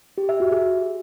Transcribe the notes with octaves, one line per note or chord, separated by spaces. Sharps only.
G4
E5
F#4
G#4